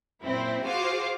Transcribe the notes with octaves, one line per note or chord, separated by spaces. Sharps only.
F#2 A#2 C4 E4
F4 F#4 G#4 C5 F5 D6